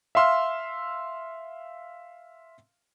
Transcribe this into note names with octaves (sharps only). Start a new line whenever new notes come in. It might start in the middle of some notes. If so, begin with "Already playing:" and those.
E5 F5 C6 E6 F6